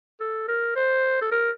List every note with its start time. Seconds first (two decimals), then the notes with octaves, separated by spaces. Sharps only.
0.21 A4
0.48 A#4
0.76 C5
1.22 A4
1.31 A#4